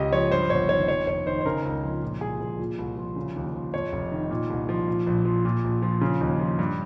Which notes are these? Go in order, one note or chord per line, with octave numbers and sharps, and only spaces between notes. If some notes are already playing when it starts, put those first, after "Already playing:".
Already playing: C#2 C#3 G4 D#5
F3 C#5
G2 C5
G1 C#5
D#3 C#5
F2 C#5
F1 C#5
D#3 C5
C5
C#3 A#4
C#2
F3
A#2
C2 G#4
F3
A#2
C2
F3
C#3
D#2
F3
F2 C#5
F1
D#3
A#2
C2
F3
A#2
A#1
F3
A#2
A#1
F3
C#3
D#2
F3
G2